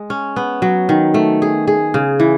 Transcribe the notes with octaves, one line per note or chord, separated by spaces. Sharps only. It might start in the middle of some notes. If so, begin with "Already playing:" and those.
Already playing: G#3
C#4
B3
F#3
D#3
A3
G#4
G#4
C#3
E3